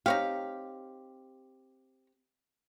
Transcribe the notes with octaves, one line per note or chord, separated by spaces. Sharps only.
C4 D#4 G4 C#5 F5